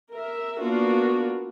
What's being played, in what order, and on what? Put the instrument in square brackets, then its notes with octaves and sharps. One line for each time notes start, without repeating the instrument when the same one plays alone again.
[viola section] A#4 E5
A#3 B3 D4 F4 F#4